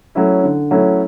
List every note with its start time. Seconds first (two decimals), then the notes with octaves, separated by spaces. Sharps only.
0.15 F#3 A3 C#4 E4
0.44 D3
0.71 F#3 A3 C#4 E4